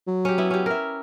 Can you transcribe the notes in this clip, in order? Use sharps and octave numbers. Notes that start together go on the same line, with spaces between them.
F#3
C#4 G4
B3 E4
C#4 G4
A#4 E5